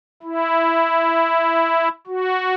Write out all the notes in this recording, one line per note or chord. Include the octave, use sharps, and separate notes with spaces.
E4
F#4